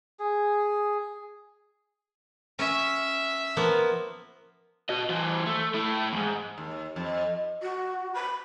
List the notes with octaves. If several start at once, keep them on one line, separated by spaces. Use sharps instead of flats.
G#4
C#4 E5
F3 A#3 B3
F#4 D#5
E3 C5
A3
A3 E4
E2 G#2
D#2
F2
F#4
B5